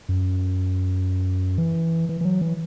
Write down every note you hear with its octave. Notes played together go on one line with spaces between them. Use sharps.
F#2
E3
E3
E3
F#3
E3